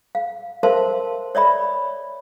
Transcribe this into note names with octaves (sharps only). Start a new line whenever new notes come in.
F5
A#4 C5 E5 F5 A5 C6
C#5 D5 E5 B5